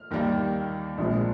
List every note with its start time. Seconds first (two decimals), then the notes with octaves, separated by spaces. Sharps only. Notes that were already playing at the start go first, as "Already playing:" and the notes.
Already playing: F6
0.11 D#2 D#3 G3 A#3
0.98 A#1 A#2 F3 G#3 C4